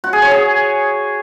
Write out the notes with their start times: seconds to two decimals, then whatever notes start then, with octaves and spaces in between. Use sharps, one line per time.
0.04 F#4
0.13 G#4
0.22 C#5
0.31 G#4